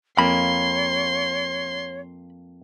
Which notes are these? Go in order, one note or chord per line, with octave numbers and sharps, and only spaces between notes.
F2 A#3 C#5 B5 C6